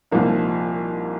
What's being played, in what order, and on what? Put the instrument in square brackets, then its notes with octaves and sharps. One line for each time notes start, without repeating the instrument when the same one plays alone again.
[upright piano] C2 A#2 F3 A#3 D#4